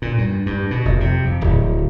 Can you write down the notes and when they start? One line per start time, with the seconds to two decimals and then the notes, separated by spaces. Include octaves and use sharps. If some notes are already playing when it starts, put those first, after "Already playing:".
0.02 A#2
0.18 G2
0.46 G2
0.71 B2
0.85 F1
1.00 C3
1.25 F2
1.41 D1